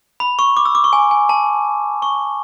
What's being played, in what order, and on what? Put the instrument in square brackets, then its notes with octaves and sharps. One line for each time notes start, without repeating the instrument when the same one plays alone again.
[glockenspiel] B5
C#6
D6
E6
D6
C#6
G#5
G#5
A5
C#6